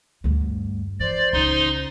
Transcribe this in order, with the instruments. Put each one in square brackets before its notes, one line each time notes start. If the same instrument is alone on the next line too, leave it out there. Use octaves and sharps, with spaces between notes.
[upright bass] D2 G2
[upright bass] E3 [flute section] C5 [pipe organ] D5
[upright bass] C#2 [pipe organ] D#4 C6